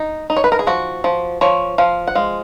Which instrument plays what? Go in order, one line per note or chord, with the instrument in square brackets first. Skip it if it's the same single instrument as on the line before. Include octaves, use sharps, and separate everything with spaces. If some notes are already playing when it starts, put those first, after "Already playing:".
Already playing: [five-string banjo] D#4
D#4
C#5
B4
A#4
G#4
F3 F#4
F3
F3 C#5
F3 F5
F#5
G#3 F5